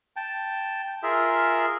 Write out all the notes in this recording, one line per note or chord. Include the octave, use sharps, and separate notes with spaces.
G5 A5
F4 G#4 A#4 E5